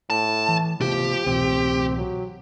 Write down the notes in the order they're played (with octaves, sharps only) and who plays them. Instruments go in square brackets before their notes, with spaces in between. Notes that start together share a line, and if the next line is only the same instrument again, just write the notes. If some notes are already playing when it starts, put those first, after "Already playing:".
[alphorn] A2 [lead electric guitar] A5
[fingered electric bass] E3
[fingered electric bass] C3 A3 B3 [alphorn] F3 [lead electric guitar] G4
[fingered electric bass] C2 B2 E3 [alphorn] C4
[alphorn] F#3